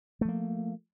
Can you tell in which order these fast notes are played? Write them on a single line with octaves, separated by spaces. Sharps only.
A3 F3 A#3